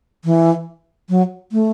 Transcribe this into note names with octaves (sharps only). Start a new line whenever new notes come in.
E3
F#3
A3